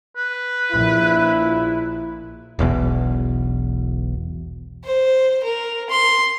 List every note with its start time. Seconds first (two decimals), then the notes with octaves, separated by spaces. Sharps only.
0.16 B4
0.72 A#1 E4
2.59 E1 B1 E2 B2
4.85 C5
5.44 A#4
5.90 C6